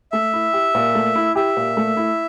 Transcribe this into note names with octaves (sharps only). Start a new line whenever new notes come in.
A3 E5
E4
G4
A#2
A3
E4
G4 E5
A#2
A3
E4